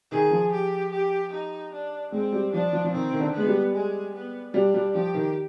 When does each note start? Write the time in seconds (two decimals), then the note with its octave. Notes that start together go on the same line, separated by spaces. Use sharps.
0.11 D#3 G#4
0.31 F3
0.52 G4
0.91 G4
1.33 D#4
1.73 D4
2.12 G#3 C4
2.32 G3
2.52 F3 D4
2.73 F3
2.84 F3
2.93 D#3 C4
3.11 D#3
3.20 D3
3.33 G#3 B3
3.46 G3
3.73 G#3
4.14 B3
4.54 G3 D4
4.74 G3
4.94 F3 G4
5.14 D#3